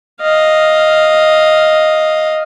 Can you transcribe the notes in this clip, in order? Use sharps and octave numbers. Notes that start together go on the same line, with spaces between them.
D#5 F5